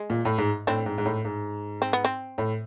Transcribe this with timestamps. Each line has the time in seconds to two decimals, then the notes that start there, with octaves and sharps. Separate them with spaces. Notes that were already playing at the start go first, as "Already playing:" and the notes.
Already playing: G#3
0.10 A#2
0.25 A2
0.38 G#2
0.67 A2 C4 D4
0.86 G#2
0.98 G#2
1.05 A2
1.25 G#2
1.82 C4
1.93 B3
2.05 C4
2.38 A2